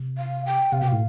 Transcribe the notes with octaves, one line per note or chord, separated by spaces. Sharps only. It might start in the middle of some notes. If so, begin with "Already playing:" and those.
Already playing: C3
F5
G5
C3 F5
B2 G5
A2 F5